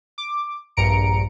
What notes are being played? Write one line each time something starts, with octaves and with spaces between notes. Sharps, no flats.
D6
A#1 G2 A#5 C#7 D7